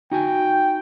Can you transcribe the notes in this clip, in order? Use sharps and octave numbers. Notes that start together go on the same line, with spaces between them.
D#4 F#4 G5 G#5